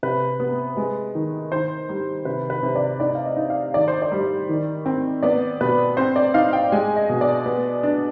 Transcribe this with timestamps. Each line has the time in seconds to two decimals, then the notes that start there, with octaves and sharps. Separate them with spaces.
0.03 C3 B4
0.40 B3
0.77 G#3
1.15 D#3
1.52 D#3 C5
1.89 G3
2.25 C3 B4
2.50 B4
2.63 C3
2.76 D5
3.00 D#4 D5
3.15 F5
3.25 D#5
3.37 D#4
3.50 F5
3.74 D#3 D5
3.88 C5
4.02 D5
4.12 G3
4.49 D#3
4.86 C4
5.23 B3 D5
5.61 B2 B4
5.97 C4 C5
6.16 D5
6.34 D#4 F5
6.53 G5
6.72 G#3 G#5
6.97 D#5
7.09 B2
7.21 D5
7.46 B3
7.83 D4